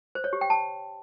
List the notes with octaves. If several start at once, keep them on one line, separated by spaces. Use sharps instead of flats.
C5
C#5
G4
G5
A5